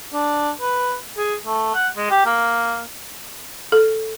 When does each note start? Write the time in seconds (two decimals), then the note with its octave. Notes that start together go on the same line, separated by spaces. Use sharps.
0.13 D4
0.61 B4
1.17 G#4
1.46 A3
1.74 F#5
1.97 G#3
2.10 G4
2.26 A#3
3.72 A4